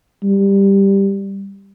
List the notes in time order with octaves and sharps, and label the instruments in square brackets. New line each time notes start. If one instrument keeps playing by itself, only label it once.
[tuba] G3